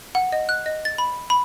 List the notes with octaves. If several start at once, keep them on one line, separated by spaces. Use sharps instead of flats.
F#5
D#5
F#6
D#5
A6
B5
B5